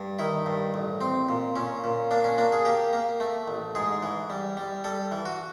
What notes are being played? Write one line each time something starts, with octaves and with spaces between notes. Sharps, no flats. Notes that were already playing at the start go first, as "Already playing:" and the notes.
Already playing: G2
D#3 E4
G2
A1
C4
A#2
A#2 C#4
A#2
A#3 D4
C#4
A#3 D4
G#4
A#3 G4
A#3
A3
A1
G#2 G#4
E3
G3
G3
G3 A4
E3
F#4